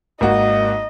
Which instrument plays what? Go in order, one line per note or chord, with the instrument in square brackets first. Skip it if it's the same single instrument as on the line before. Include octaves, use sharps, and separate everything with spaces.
[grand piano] G#1 A#3 F#4 [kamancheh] D#5